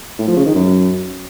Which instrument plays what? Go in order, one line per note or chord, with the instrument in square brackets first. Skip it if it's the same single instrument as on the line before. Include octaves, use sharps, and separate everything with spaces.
[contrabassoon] A2
F3
C#3
D#3
F#2